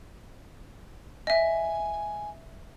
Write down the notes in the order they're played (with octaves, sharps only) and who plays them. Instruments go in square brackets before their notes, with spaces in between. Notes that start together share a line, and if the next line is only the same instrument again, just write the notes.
[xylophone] D#5 E5 [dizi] G#5